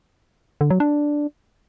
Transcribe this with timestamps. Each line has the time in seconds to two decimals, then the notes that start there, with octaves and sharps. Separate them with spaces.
0.61 D3
0.70 F#3
0.80 D4